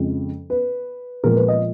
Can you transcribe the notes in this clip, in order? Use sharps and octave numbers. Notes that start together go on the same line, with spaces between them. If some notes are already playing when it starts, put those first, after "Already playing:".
Already playing: F2 C#3 F3 G#3
B4
A#2 F3 G#3 A#4
B4
D#5